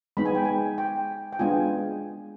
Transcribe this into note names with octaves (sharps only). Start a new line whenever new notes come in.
G#3 B3 D#4 B5
G#5
G5
G#5
G5
G5
G#3 B3 D4 F4 G#5